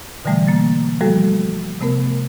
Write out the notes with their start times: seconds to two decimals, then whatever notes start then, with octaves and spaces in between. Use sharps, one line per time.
0.25 B2 D3 E3 G3 A3
0.48 A#3 A6
1.01 F3 G3 A3 F#4 A4
1.81 C3 A3 B3 A#4